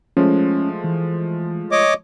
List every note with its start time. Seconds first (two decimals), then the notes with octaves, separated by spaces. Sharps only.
0.17 F3 G#3 A3 C#4
0.84 E3
1.72 C#5 D#5 D6